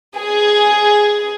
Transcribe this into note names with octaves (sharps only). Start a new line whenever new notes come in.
G#4